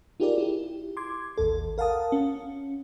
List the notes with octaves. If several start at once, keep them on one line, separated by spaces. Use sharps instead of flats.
D#4 F4 G4 G#4 A#4 D5
E4 G4
C6 D6 G#6
A1 D#2 A4
A#4 F5 F#5 A5 D#6
C#4